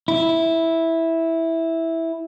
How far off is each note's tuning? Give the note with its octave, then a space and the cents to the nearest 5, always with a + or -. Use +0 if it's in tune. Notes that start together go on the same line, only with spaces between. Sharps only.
E4 -5